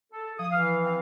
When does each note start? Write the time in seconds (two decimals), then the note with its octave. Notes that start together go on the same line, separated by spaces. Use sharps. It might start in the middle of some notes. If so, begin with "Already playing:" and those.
0.13 A4
0.39 F3 D#6
0.51 E3 F5
0.83 C4 F5